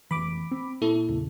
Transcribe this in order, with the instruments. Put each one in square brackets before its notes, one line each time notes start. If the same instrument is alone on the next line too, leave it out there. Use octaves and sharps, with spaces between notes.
[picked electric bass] F1 E3 [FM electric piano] B5 D6
[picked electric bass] C4
[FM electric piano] A#2 E4 A4
[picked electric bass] B1 E2 C#3